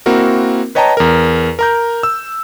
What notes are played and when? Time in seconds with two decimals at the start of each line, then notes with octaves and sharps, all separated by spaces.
0.06 A#3 C4 E4 F#4 A#4
0.75 B4 C#5 D#5 G5 A5 A#5
0.97 E2 A#4
1.59 A#4 A#5 G6
2.03 E6